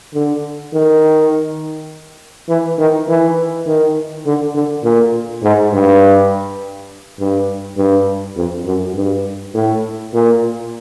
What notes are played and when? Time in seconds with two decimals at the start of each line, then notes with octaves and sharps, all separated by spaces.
0.14 D3
0.73 D#3
2.49 E3
2.78 D#3
3.08 E3
3.66 D#3
4.26 D3
4.55 D3
4.83 A#2
5.43 G#2
5.73 G2
7.19 G2
7.77 G2
8.36 F2
8.65 F#2
8.95 G2
9.54 A2
10.13 A#2